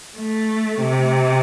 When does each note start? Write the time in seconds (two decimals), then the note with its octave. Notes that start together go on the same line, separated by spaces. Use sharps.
0.18 A3
0.82 C3